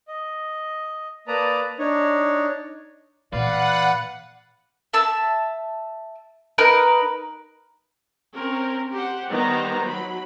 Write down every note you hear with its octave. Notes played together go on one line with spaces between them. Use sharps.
D#5
A#3 B4 D5 A5 A#5 D#6
D4 D#4 C#5
A#2 E3 B4 D5 F5 F#5
E5 A5 E6
D#4 A#4 B4
C4 C#4 A#4
G4 C5 F#5
D#3 G3 B3 D#4 C5 A#5
F#3 B5